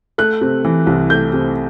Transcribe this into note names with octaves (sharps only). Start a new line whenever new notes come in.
A3 F#6
C3
E3
C2
A3 G6
C3